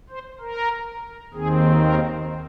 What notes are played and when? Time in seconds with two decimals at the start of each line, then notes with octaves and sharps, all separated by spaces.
0.10 C5
0.41 A#4
1.34 D#2 D#3 C4 G#4
1.81 A#4